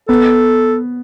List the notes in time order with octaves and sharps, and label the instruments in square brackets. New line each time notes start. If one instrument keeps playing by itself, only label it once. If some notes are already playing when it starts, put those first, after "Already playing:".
[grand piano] B3 [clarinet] A4